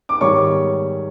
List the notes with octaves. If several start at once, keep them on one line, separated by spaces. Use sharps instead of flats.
D6
G#2 D#3 G3 C#5 C#6